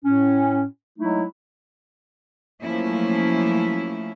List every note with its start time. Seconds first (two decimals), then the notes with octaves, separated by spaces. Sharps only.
0.04 A2 C#4
0.98 F#3 G#3 A3 D#4 E4
2.62 F3 F#3 A3 A#3 C#4 E4